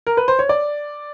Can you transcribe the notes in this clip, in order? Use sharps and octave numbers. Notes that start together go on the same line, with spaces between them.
A#4
B4
C5
C#5
D5